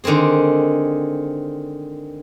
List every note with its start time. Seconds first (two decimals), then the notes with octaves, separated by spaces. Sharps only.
0.04 D3 D#3 G#3 C4 G#4